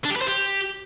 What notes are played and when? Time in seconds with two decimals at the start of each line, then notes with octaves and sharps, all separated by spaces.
0.05 D4
0.10 G4
0.16 B4
0.21 C5
0.27 G4